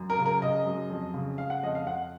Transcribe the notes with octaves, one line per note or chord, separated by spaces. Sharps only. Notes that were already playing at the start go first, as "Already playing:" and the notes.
Already playing: F#2
A#4
C#3
A#4
C#3 D#5
F#2
F2
C#3
C#3 F5
F#5
F2 D#5
F5
F2 F#5